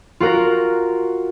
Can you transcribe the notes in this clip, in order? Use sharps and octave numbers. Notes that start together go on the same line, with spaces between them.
F4 F#4 A#4